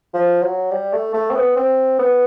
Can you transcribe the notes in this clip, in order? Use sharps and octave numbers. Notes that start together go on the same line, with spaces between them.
F3
F#3
G3
A3
A3
C4
B3
C4
B3